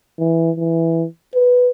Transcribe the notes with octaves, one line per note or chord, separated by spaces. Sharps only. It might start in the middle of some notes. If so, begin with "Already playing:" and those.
E3
E3
B4